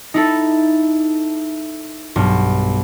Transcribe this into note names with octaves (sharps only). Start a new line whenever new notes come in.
D#4 E4 A4
B1 G2